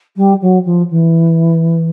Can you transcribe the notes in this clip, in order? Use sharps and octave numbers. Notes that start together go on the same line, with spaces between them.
G3
F#3
F3
E3